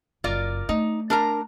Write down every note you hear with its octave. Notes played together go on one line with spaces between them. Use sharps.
F#1 F#2 F4 A#4 D5
A3 D#4
D4 A#4 A#5